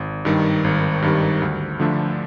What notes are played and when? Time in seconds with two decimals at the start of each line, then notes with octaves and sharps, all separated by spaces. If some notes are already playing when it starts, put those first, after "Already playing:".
Already playing: G#1
0.25 G2 D#3 G3
0.64 G#1
1.02 G2 D#3 G3
1.42 D2
1.80 D3 F3 A3 D4